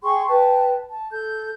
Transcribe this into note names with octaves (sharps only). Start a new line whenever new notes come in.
G#4 G5 C6 C#6
B4 G5 A5
A5
A4 G6